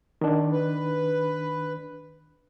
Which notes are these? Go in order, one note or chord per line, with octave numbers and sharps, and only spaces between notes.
D#3 D4
B4